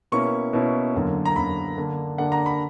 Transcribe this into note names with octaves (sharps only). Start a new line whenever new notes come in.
B2 A#3 C#4 E4 C#6
B2 A#3 C#4 E4
F#2 D3 A#3
A#5
F#2 D3 A#3 B5
D3 A#3 D4
D3 A#3 D4 F#5
A#5
B5